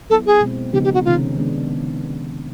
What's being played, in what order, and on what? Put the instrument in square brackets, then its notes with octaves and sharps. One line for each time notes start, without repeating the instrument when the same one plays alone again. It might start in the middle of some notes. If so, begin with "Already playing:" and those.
[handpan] F#3 B3 E4 [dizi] A4
[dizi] G#4
[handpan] B2 G#3 C4
[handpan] C#3 F3 G#3 B3 D#4 [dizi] G4
[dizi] G4
F#4
[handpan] C3 D#3 G#3 C#4 [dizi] F4
[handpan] D#3 G#3 B3 D4